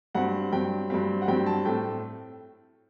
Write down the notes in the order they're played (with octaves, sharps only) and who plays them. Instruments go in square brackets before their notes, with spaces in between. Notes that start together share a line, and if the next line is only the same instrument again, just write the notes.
[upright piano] G2 F#3 C4 F#5
G2 F#3 C4 G5
G2 F#3 C4
F#5
G2 F#3 C4 G5
A5
A2 A3 C4 G5